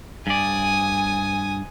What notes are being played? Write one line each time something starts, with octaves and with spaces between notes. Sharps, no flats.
G2 D5 G#5 D#6